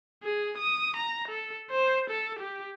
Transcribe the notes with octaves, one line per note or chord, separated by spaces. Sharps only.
G#4
D#6
A#5
A4
C5
A4
G4